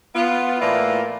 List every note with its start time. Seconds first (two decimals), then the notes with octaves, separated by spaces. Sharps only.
0.16 B3 F4
0.61 A2 E3 A#3 F4 D5 E5